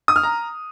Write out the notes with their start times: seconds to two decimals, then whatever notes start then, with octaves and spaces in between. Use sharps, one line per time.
0.08 D#6
0.16 F6
0.23 A#5